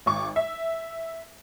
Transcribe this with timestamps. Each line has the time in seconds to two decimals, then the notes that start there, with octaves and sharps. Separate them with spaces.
0.06 G#1 C#6 D6
0.36 E5